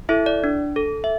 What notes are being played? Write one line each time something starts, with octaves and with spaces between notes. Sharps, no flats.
E4 A4 E5
D5
D4
A4
E5